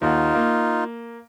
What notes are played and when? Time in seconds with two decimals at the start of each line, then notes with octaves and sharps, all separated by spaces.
0.02 D#2 D#4 F4 F#5
0.35 A#3